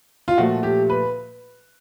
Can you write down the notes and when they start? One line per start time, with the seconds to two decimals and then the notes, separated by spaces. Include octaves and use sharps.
0.28 F4
0.37 A#2 F3 A3 F#4
0.63 G4
0.90 B4